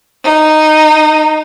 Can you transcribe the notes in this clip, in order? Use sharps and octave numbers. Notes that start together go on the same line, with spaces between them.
D#4